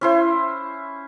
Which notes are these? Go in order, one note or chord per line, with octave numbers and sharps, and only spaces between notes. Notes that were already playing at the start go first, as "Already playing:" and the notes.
C#4 E4 C5